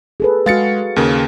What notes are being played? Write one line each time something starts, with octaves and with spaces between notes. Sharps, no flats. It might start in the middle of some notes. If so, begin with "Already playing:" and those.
G#4 A4 B4
G#3 F#4 F5 A6 C#7
D#2 C#3 A#3